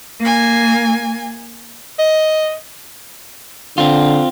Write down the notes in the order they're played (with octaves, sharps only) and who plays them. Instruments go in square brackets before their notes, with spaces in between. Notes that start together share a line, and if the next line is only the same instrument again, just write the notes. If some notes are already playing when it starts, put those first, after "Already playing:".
[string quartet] A#3 G#5
[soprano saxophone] D#5
[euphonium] D3 [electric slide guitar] C4 F4